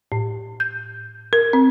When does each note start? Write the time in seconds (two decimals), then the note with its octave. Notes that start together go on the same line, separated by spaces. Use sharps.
0.12 A2
0.60 G6
1.33 A#4
1.53 C4